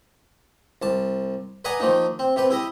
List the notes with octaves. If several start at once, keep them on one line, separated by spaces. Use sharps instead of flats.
C2 A5
B4 D5 D#5 F#5 G#5 A#5
D#3 F3 A#3 D#4
C4
C3 G4 B4
E4 G4 D#5